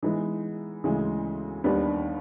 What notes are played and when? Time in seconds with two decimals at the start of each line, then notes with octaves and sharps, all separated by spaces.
0.03 E3 G#3 B3 D#4
0.84 D2 C#3 E3 G#3
1.64 D#2 D#3 G3 B3 D4